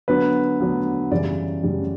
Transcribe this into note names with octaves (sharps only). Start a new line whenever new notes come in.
D3 F#3 B3 B4
D3 F#3 B3
F#2 C#3 E3 G3 D5
F#2 C#3 E3 G3